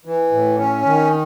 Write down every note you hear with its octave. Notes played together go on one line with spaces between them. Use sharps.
E3
A2
C#4
D#3